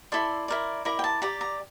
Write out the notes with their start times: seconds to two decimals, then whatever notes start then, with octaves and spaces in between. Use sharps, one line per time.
0.12 E4 A4 D5 C6
0.48 E4 A#4 D5
0.85 E4 A#4 D5 A#5
0.99 G5
1.04 A5
1.22 G4 D5 A#5
1.41 A#5